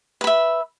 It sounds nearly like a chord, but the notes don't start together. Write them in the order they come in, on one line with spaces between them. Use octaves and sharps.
B4 B5 E5